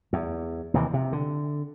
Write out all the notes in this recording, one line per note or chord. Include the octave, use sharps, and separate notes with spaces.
E2
D#2 C3 E3
C3
D3